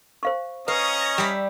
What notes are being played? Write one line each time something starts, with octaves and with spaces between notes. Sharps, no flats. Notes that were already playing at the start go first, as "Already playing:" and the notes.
C5 F5 C#6
C#4 B4 D#5 F5 A#5 C#6 D#6
G3 E5